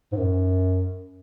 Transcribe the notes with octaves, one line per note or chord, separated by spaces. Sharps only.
G#2
F#2